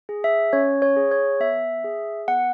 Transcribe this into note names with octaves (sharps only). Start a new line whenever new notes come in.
G#4
E5
C#4 C#5
C#5
G#4
C#5
B3 E5
G#4
B3 F#5